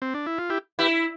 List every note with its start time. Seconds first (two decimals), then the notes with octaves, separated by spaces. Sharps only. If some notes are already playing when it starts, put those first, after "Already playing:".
0.02 C4
0.14 D4
0.26 E4
0.38 F4
0.50 E4 G4
0.79 E4 G4 B4